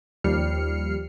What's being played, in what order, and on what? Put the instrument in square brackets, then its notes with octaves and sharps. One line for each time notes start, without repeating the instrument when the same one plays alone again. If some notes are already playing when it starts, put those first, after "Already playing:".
[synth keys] D#2 F3 G3 F6 C7 C#7